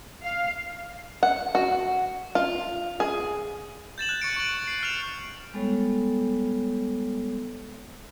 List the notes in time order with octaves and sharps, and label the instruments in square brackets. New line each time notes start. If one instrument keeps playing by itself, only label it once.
[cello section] F5
[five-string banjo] F#5
F#4
F4
G#4
[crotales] G6 A6 E7 F#7
F#6
C#6 C#7 D7
C#6 F#7
C7
F6 A6 E7 F7
[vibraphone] G3 G#3 B3 A4 C#5